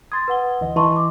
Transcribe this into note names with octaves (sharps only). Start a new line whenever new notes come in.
C6 D#6 G#6 A6
B4 F#5 G7
D2 E3 D#5
E3 D#5 A5 C6 C#6
D6